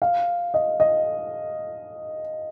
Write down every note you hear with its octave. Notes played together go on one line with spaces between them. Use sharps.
F5
D#5
D#5